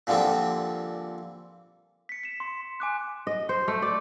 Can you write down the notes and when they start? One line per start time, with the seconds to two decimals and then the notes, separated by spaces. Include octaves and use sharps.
0.07 A#2 D3 F3 G3 C4
2.09 B6 C#7
2.23 B6 E7
2.40 C6
2.80 G#5 D6 F#6
3.27 D#5
3.49 C5
3.68 A3
3.82 D5